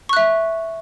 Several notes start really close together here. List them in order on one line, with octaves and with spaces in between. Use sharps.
C#6 F#6 E5